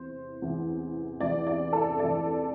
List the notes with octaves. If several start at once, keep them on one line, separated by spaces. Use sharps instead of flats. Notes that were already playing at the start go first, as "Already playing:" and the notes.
Already playing: E2 C3 E3 C5
E2 C3 E3
E2 C3 E3 D5
D5
A4
C3 E3 D5